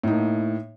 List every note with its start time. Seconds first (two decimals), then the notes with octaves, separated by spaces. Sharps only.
0.04 A2
0.07 D#4
0.11 A#3